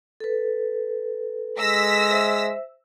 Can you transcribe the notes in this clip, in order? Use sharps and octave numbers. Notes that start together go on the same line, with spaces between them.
A4 B4
G#3 E6 A#6 B6
C5 E5